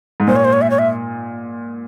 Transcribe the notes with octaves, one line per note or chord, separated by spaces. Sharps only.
G#2
A#2 C5
C#5
C5
C#5
E5
C#5
E5